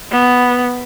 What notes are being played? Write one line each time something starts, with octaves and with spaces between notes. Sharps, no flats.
B3